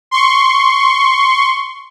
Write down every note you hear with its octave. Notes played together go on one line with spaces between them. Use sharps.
C6 C#6